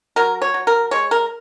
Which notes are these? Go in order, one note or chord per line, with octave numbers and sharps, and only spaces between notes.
F#3 A#4
C#5
F#3
A#4
G#3 C#5
A#4